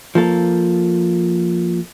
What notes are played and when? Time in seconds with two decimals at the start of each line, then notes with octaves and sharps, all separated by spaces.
0.15 F3 A#3 A4